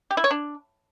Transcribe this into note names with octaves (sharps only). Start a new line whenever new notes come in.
G4
E4
C#5
D4